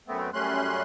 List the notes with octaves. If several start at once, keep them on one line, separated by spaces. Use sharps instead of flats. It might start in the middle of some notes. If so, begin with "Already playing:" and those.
F#2 A3 B3 C4
F#2 G3 A3 C#4 C6 F#6